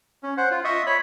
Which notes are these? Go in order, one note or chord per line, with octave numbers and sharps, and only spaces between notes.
C#4
C5 F#5
F4
D#5 E5 C#6 D#6
C#5 B5